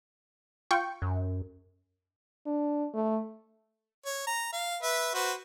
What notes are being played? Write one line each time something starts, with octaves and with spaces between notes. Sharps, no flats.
F4 G5 C#6
F#2
D4
A3
C#5
A#5
F5
B4 E5
F#4 B4 C5